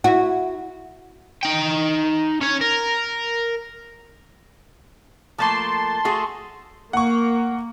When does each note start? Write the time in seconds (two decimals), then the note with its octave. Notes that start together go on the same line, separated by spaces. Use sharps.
0.04 E4 F#4
1.43 D#4 G5
2.41 C#4 C#5
2.61 A#4
5.38 F3 A3 A#3 A5 C6
6.05 A3 F#4 G#4
6.93 A#3 F#5 C#6